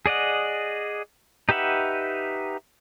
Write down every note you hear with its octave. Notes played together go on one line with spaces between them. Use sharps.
G#4 D5 D#5 F#5
D#4 G4 B4 E5 F#5